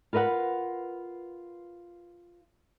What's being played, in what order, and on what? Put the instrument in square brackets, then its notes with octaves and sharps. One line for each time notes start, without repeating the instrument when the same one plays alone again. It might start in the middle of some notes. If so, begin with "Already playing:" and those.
[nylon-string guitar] F4 A#4 B4 D#5 F#5